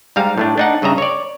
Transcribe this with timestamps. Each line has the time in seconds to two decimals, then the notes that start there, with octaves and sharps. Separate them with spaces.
0.16 G#2 G3 F5 A#5
0.38 A2 A3 D4
0.58 D4 D#4 F#5
0.82 G2 C#3 D#5 E5 A#5
0.98 C#5 D5